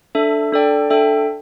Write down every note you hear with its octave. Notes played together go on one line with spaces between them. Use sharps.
D4 A4 E5
D4 A4 D5 G5
D4 A4 E5 G5